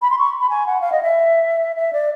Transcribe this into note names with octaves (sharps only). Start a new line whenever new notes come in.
B5
C6
C#6
B5
G#5
F#5
F5
D#5
E5
E5
D5